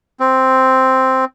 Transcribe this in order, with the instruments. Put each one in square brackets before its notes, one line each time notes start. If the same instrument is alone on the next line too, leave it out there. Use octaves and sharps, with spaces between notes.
[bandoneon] C4